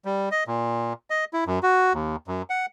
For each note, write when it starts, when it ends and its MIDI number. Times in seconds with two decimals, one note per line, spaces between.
0.05 0.29 55
0.31 0.44 75
0.47 0.93 46
1.10 1.25 75
1.33 1.44 64
1.47 1.59 42
1.63 1.93 66
1.94 2.16 39
2.28 2.42 42
2.50 2.66 78